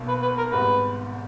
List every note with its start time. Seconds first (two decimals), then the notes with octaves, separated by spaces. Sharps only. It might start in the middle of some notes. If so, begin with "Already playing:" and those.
Already playing: B1 B2 A#3
0.08 B4
0.22 B4
0.38 A#4
0.52 G#1 G#2 G3 B3 B4